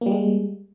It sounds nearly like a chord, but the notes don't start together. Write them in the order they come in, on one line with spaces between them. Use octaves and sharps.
A#3 G3 G#3